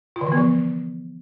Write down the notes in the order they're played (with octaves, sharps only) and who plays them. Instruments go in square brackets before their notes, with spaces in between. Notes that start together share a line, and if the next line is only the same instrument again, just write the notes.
[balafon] F4
D3
E3
B3
F3